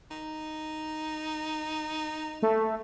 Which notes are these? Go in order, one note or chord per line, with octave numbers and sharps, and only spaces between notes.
D#4
A3